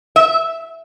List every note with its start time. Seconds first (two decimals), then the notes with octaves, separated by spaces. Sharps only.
0.16 E5